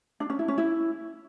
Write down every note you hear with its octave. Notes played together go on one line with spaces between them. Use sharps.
D4
C#4
E4
C#4
E4